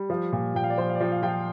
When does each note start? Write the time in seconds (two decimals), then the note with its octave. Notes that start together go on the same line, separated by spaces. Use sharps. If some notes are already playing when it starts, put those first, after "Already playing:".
Already playing: G3
0.10 F3
0.32 A#2
0.54 A#2 G5
0.64 F5
0.70 D5
0.78 F3 C5
0.89 F5
0.95 D5
1.00 F3
1.12 F5
1.23 F3 G5
1.28 F5